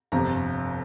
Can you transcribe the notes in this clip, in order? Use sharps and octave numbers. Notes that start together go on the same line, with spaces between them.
G1 F2 C3 A#5